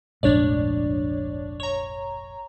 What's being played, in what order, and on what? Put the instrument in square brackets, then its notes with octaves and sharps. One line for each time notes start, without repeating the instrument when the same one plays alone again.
[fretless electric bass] F1 A#1 G#2 [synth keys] D4 C#5 D5
[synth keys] C#5 A#5